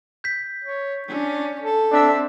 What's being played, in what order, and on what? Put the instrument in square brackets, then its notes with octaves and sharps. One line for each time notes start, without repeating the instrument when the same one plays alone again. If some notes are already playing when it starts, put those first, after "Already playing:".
[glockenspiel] G6 B6
[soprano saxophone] C#5
[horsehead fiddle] C#4 [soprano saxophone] D4
[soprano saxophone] A4
[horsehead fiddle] C4 E5 [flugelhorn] D4